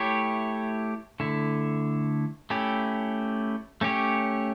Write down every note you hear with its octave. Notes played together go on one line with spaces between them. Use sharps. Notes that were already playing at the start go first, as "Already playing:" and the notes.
Already playing: A3 E4 G4 C#5
D3 A3 E4
A3 C#4 E4 G4
A3 C#4 G4 C#5